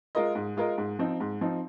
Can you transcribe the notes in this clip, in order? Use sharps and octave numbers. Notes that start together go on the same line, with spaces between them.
G#3 F4 A#4 D#5
G#2
G#3 F4 A#4 D#5
G#2
F3 C4 D#4
G#2
F3 C4 D#4